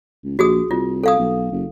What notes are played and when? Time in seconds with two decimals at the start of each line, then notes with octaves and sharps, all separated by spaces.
0.24 C#2
0.39 A#1 F#4 G#4 D#6
0.71 C2 F4
1.03 A4 F5 D#6
1.19 B1
1.52 F#1